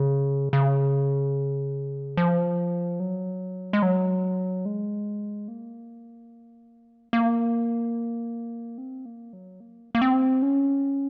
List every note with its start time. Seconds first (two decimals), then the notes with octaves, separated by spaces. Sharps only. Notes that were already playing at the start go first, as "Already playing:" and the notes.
Already playing: C#3
0.53 C#3
2.17 F3
3.00 F#3
3.73 G#3
3.83 F#3
4.66 G#3
5.48 A#3
7.13 A#3
8.78 C4
9.05 A#3
9.33 F#3
9.60 A#3
9.95 A#3
10.02 C4
10.42 C#4